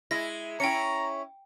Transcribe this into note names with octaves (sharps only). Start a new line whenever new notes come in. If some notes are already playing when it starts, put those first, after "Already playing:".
G#3 E4 A#6
C#4 E4 G5 A#5 C#7